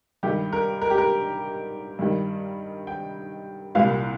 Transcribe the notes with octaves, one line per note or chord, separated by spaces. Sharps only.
G2 D#3 G3 G4
A#4
A#4
G4
A#4
G2 D#3 G3
G5
C2 A#2 G3 F5